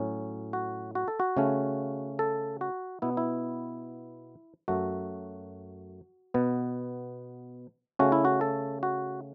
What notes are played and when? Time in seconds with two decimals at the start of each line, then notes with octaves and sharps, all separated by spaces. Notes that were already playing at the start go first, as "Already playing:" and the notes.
Already playing: A2 F#3 C#4
0.53 F#4
0.95 F#4
1.08 A4
1.20 F#4
1.37 C#3 A3 C#4
2.19 A4
2.61 F#4
3.02 B2 B3 E4
3.17 E4
4.68 F#2 F#3 A3 F#4
6.34 B2 B3
7.99 C#3 A3 C#4 F#4
8.12 E4
8.25 F#4
8.41 A4
8.83 F#4